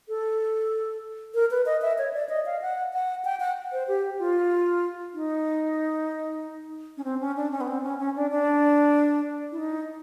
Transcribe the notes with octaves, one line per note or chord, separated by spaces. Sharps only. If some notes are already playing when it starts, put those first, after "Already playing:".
A4
A#4
B4
D#5
E5
C#5
D5
D#5
F5
F#5
F#5
G5
F#5
C5
G4
F4
D#4
C#4
C4
C#4
D4
C#4
B3
C4
C#4
C#4
D4
D4
E4
D#4